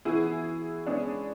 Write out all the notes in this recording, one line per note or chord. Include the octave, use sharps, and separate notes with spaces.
E3 B3 E4 F#4 G#4
G#3 B3 C#4 D4 G#4 C#5